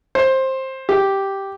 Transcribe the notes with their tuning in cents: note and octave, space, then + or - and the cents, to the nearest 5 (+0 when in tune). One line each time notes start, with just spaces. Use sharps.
C5 +15
G4 -5